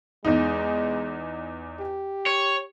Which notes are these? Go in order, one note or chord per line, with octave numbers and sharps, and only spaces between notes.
E2 G#3 D#4
G4
C#5